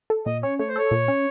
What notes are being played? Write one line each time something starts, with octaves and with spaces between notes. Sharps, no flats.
A4
A#2 D#5
C#4 C#5
A3 C#5
C5
A4 C#5
A#2
C#4